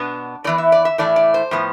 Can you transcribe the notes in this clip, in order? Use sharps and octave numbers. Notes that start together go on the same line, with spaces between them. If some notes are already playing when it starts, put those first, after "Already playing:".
Already playing: B2 B3 D4
A2 E3 B3 D5
E5
D5
E5
A2 E3 A3 D5
D5
C5
A2 F3 B3